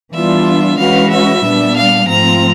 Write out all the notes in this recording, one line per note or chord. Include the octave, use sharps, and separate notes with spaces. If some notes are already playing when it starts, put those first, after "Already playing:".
E3 G3 B3 D4 F4 E5
E3 G#3 C#4 F#4 B4 F5
E5
A#2 G3 B3 D4
F5
G#2 F3 A3 C4 F4 A#5